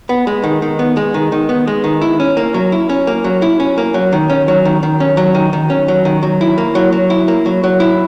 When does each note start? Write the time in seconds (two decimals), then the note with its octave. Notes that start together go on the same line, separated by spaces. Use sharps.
0.09 B3
0.27 G#3
0.44 D#3
0.62 D#3
0.79 B3
0.97 G#3
1.14 D#3
1.32 D#3
1.49 B3
1.67 G#3
1.84 D#3
2.02 E4
2.20 C#4
2.37 A#3
2.54 F#3
2.72 E4
2.90 C#4
3.07 A#3
3.24 F#3
3.42 E4
3.60 C#4
3.78 A#3
3.94 F#3
4.12 D#3
4.30 C#4
4.48 F#3
4.65 D#3
4.83 D#3
5.00 C#4
5.17 F#3
5.35 D#3
5.53 D#3
5.70 C#4
5.88 F#3
6.05 D#3
6.23 F#3
6.41 E4
6.58 A#3
6.75 F#3
6.92 F#3
7.10 E4
7.28 A#3
7.46 F#3
7.64 F#3
7.80 E4